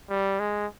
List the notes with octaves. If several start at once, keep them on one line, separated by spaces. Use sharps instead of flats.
G3
G#3